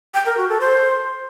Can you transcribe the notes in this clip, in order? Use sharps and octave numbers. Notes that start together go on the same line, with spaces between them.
G5
A#4
F#4
A4
C5